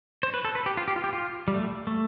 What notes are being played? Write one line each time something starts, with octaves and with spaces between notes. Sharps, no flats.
C5
B4
A4
B4
G4
F4
G4
F4
G4
F4
G3
A3
A3